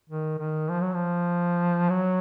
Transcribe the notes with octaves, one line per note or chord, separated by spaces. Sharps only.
D#3
D#3
F3
F#3
F3
F#3